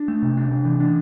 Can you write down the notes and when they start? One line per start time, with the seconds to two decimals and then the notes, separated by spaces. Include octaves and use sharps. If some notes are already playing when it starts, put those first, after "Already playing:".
Already playing: D4
0.08 A3
0.22 C3
0.37 D4
0.51 C3
0.65 E3
0.80 D4